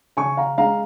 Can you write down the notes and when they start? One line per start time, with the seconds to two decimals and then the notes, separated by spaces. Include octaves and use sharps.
0.17 C#3 G#5 C#6
0.37 F5 A#5
0.57 G#3 F5 A#5